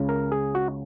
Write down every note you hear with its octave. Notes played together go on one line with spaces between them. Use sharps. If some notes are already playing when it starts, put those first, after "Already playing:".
Already playing: C#2 C#3
A#4
G#4
F#4